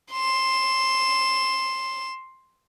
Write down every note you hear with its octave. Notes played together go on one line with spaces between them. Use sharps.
C6 E7